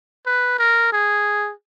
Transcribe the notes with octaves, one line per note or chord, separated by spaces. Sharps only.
B4
A#4
G#4